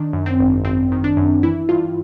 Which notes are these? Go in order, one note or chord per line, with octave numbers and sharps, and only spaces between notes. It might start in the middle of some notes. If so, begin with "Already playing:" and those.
Already playing: D#3 D4
F#2
C4
G#1
G#1 C4
D#3
D4
F#2
E3 E4
G2 F4